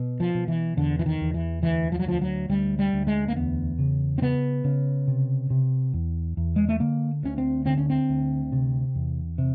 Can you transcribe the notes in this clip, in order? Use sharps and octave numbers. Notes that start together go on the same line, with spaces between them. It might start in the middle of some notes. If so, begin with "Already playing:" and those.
Already playing: B2
F3
B2
E3
E2 D3
E3
D#3
E2
E3
D2 E3
F3
F#3
D2 F3
F#3
D2 G3
G3
D2
G#3
A#3
E2 B3
C#3
C4
C#3 B3
C#3
C3
C3
E2
E2
G#3
A3
D3 A#3
D2 C#4
C4
D3 C4
C#4
C4
D2
C3
E2
C3